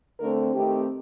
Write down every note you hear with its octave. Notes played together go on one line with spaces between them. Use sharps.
D3 A3 C4 A#4
D#3 A3 C4 D#4 G4